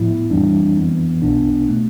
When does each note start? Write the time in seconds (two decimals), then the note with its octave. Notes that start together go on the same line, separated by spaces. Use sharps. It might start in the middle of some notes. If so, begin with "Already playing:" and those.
Already playing: A2 F3 B3 E4
0.30 F2 E3 G3 C4 D4
0.76 F2 E3 B3
1.22 B1 B2 B3 D4
1.68 B2 A3